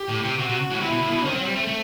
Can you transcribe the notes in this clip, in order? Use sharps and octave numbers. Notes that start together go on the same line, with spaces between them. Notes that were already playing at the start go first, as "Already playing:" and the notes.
Already playing: G4
A2
C3
C3 F#4
C3
A2
C3 E4
B2
A2
B2
D#3 C4
F#3
G3
A3
A3